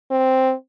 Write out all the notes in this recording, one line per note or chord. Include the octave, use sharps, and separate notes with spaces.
C4